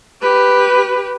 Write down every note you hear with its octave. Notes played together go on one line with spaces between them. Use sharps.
G4 B4